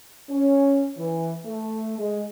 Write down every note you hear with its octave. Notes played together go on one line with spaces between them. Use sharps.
C#4
E3
A3
G#3